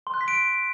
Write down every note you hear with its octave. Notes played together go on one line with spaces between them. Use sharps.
C6
F#6
B6
D7